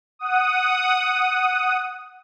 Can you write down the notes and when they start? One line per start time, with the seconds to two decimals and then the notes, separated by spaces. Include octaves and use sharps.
0.19 F#5 D#6